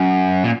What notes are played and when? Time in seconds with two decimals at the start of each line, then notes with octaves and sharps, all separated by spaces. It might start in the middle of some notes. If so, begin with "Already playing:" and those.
Already playing: F#2
0.44 A#2